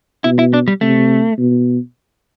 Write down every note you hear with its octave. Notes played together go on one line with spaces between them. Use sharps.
B2 E4
E4
D4
G3
C3 A3
B2